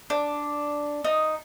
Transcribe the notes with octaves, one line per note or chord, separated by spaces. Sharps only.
D4
D#4